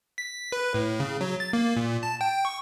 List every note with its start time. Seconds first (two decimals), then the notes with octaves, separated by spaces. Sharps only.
0.18 B6
0.52 B4
0.74 A2
1.00 C#3
1.21 F#3
1.40 A6
1.53 A#3
1.76 A#2
2.03 A5
2.21 G5
2.45 C#6